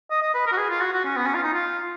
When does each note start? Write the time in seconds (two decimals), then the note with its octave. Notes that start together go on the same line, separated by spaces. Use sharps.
0.11 D#5
0.22 D#5
0.34 B4
0.46 A#4
0.52 F#4
0.58 G#4
0.70 F4
0.81 F#4
0.93 F#4
1.05 C#4
1.16 B3
1.26 C#4
1.34 F4
1.43 D#4
1.53 F4